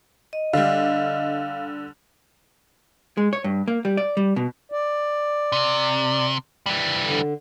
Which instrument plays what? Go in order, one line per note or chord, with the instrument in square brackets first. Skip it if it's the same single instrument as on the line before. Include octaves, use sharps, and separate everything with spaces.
[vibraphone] D#5
[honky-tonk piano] D3 G3 [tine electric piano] F5
[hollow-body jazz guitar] G#3
C#5
G2
A#3
G3
D5
G3
B2
[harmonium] D5
[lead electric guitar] C3
E3 G3
[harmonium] D3